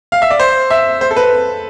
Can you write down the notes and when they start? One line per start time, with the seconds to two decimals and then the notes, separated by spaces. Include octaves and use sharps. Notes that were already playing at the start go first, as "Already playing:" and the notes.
0.12 F5
0.22 E5
0.30 D5
0.40 C5
0.70 E5
1.01 C5
1.11 A4
1.16 B4